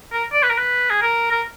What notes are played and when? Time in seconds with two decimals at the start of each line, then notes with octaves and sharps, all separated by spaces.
0.13 A#4
0.33 D5
0.43 B4
0.50 A#4
0.58 B4
0.90 G#4
1.02 A#4
1.31 A#4